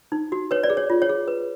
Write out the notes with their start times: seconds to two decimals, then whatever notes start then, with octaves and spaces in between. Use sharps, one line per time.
0.12 D#4
0.32 F#4
0.51 B4 C#5
0.63 D5
0.70 G#4
0.77 C#5
0.90 F4
1.02 C#5
1.09 G#4
1.28 B4